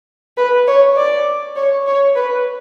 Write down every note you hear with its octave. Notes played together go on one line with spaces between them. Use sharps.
B4
C#5
D5
C#5
C#5
B4